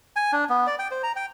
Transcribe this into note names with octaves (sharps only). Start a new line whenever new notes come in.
G#5
D4
B3
D5
G5
C5
A#5
G5